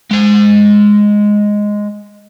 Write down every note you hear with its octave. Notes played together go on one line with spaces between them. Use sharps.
G#3 A#5